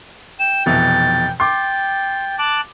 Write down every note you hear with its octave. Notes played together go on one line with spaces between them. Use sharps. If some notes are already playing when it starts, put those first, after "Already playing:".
G5 E7
F1 B2 E3 A6
G5 C6 D6 A6
A5 D6 F#6